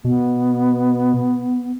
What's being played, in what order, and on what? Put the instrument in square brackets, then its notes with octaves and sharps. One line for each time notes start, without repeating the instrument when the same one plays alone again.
[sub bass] B2 [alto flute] B3